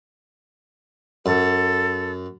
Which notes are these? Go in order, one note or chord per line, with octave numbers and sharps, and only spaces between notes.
F#2 A4